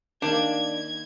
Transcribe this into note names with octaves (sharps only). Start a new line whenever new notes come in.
D#3 A#3 D4 G#6